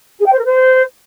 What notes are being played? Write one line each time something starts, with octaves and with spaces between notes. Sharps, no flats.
G#4
G5
C5
A#4
C5